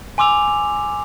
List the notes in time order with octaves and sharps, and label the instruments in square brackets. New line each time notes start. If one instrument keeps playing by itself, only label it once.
[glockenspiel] G#5 C6 D6 E6 F7